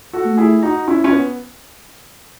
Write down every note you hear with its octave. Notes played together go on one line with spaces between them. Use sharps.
F#4 A4
A3
E4 G#4
D#4 F#4
C#4 E4
C#4
B3